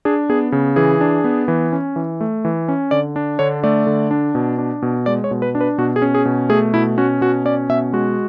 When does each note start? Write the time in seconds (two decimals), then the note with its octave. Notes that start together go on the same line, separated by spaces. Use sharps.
0.05 D4 G#4
0.29 B3 G#4
0.52 C#3
0.76 E3 G#4
1.01 D4
1.24 B3
1.48 E3
1.73 C#4
1.96 E3
2.21 A3
2.45 E3
2.68 C#4
2.91 D3 D5
3.16 D4
3.39 D3 C#5
3.64 A3 D5
3.87 D3
4.11 D4
4.35 B2
4.58 D4
4.82 B2
5.06 G#3 D5
5.24 C#5
5.31 B2
5.42 B4
5.55 D4
5.61 B4
5.78 B2 F#4
5.96 G#4
6.02 C#4
6.14 G#4
6.25 B2
6.49 A3 G#4
6.74 B2 E4
6.98 C#4 F#4
7.21 B2 F#4
7.45 C#4 D5
7.69 B2 E5
7.93 G#3 F#4